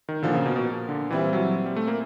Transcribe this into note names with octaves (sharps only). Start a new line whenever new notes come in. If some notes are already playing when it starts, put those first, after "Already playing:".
D#3
A#2 D3 F3 A#3
C#3
B2
B2
D3
A#2 E3 G3 C4 E4
F#3
G3
A3
A#3